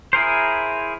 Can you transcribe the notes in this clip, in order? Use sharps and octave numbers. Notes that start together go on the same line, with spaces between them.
E4 G#4 A#4 C5